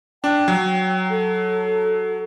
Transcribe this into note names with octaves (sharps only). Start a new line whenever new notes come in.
D4 G5
F#3
A4